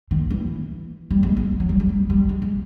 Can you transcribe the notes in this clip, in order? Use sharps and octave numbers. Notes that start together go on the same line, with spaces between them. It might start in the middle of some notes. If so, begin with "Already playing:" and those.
D#3
E3
G3
G#3
G#3
F#3
G3
G#3
G3
G3
G#3
G#3